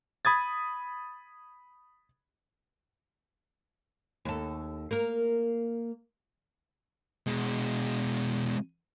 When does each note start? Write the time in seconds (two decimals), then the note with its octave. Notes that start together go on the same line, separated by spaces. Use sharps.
0.25 B5 D#6 G#6 A6
4.25 D#2 A4
4.91 A#3 A#4
7.27 B2 G#3